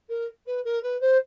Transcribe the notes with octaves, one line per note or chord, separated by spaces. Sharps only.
A#4
B4
A#4
B4
C5